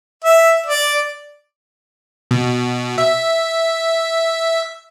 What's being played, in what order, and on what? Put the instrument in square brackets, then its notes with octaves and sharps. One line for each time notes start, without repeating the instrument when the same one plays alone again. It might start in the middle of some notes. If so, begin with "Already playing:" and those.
[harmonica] E5
D5
[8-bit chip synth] B2
E5